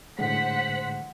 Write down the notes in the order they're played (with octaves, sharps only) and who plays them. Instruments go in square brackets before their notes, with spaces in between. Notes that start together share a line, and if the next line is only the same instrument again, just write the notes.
[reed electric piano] A2 D3 G#3 [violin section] C5 F#5 B6